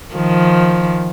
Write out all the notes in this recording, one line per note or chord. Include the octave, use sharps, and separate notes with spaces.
D#3 F3